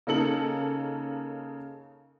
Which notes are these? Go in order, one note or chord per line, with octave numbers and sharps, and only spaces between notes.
C#3 A#3 D#4 A4 C#7 F#7